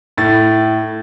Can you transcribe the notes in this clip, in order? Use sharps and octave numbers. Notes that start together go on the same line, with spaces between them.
A2 A6